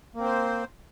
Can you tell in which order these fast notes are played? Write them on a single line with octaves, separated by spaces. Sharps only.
A#3 C4 C5